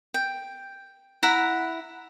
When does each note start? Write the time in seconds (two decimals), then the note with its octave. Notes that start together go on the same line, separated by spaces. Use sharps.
0.14 G5
1.23 E4 F#5 A#5 B5